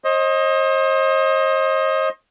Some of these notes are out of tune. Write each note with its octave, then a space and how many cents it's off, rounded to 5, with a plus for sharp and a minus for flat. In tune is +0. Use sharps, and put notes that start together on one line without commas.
C5 +40 D#5 +10